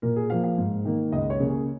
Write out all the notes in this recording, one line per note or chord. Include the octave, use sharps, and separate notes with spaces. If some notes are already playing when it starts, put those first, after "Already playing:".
A#2 A#4
G#4
F3 A#3 F5
F5
G#2
D#3 A#3
C#2 D#5
C#5
C#3 A#3
G#4